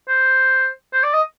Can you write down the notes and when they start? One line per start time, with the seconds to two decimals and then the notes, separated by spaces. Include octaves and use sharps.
0.08 C5
0.93 C5
1.03 D5
1.14 D#5